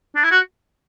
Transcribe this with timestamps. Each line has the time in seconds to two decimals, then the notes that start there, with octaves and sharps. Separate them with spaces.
0.15 D4
0.23 E4
0.31 F#4